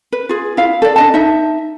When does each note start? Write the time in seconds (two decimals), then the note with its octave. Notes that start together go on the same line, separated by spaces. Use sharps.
0.13 B4
0.29 F4 G#4
0.57 E4 F5
0.82 A4 D5
0.96 D4 D#5 A5
1.14 D#4 E5